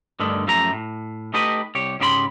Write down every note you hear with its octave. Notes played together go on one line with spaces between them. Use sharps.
G2 D3 D#3 A3
F#2 F3 A3 G4 A#5
A2
A3 D#4 G4 B4 D#5
C2 G4 C#5
G#2 C#3 G4 C5 B5 C6